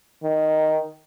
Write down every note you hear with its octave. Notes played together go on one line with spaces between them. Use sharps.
D#3